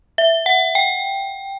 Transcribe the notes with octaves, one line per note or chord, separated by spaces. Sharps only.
E5
F#5
G5